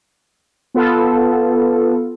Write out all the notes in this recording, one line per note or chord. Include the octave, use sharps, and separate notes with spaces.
B3 F4 A4